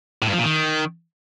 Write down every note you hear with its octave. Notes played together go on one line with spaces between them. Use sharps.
A2
G2
F3
A#2
D#3